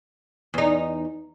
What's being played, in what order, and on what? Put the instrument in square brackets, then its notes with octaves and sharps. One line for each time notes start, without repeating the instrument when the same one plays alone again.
[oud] E2 D#4